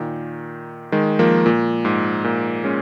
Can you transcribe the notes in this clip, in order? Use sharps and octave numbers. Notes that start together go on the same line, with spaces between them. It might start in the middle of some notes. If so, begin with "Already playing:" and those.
Already playing: A#2 D#3
D#3 G#3
F3 A#3
A#2
G#2
A#2
G#3 C#4